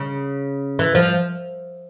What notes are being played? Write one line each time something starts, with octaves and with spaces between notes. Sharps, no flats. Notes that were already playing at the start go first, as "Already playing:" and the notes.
Already playing: C#3
E3
F3